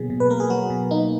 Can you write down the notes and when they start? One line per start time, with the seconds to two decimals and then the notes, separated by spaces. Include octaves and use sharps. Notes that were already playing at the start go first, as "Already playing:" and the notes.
Already playing: B2 F#3 A#3 G#4
0.10 B2
0.20 B4
0.30 A#3 A#4
0.40 G#4
0.50 F#3 F#4
0.70 B2
0.91 A#3 D#4